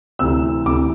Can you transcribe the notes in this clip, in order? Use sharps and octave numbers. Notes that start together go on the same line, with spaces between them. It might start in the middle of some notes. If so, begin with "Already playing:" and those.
D2 C3 E3 E6
D2 C3 E3 D6